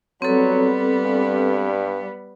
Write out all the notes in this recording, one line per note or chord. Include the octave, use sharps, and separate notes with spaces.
F#3 G3 B3 C4 A4
G2